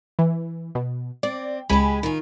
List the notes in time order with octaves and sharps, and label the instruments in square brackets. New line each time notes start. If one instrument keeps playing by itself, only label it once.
[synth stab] E3
B2
[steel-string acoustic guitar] C4 [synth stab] D5
[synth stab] C#2 G#5 B5 [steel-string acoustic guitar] G#3 G4
[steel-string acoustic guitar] D#3 F4